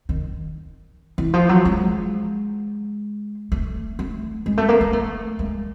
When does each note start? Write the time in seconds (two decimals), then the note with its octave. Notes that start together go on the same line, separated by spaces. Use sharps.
0.09 D#3
1.18 E3
1.34 F3
1.49 F#3
1.65 G#3
3.52 A3
3.99 A3
4.46 G#3
4.58 A3
4.69 A#3
4.81 A#3
4.93 A3
5.39 G#3